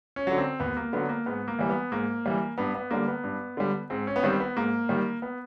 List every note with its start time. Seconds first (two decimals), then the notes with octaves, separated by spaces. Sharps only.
0.16 C#4
0.27 D3 F#3
0.38 C4
0.60 D#2 B3
0.77 A#3
0.93 D3 F#3 B3
1.09 A#3
1.26 G#2 B3
1.48 A#3
1.59 E3 G3
1.70 B3
1.92 G#2 A#3
2.26 E3 G3
2.58 G2 B3
2.75 B3
2.91 D3 G3 A#3
3.08 B3
3.24 G2
3.57 D3 G3
3.90 G#2 C4
4.07 C#4
4.16 B3
4.23 D#3 G3 C4
4.40 B3
4.56 G#2 A#3
4.89 D#3 G3
5.22 B3